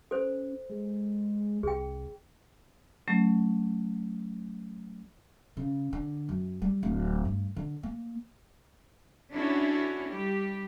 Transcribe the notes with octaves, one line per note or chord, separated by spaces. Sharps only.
C#4 A4 C5
G#3
C2 G#4 G5
F#3 A3 C#4
C#3
D3
F#2
G3
D1
G2
D3
A#3
C#4 D4 E4 F#4 A4 C#5
G3 G4